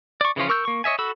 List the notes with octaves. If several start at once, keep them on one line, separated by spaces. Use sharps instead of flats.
D5 C#6
C#3 E3 F3 C#4 F4
A#4 C#6 E6 G6
A#3 C#6
C#5 D#5 E5 G#5
F#4 A4 B5 E6